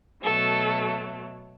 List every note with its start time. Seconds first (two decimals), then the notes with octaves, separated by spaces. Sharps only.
0.23 B2 F#3 A3 A4